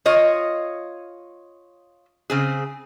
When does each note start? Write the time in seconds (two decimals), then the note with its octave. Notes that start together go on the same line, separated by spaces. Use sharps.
0.06 F4 C#5 D#5
2.30 C#3 C4 G#4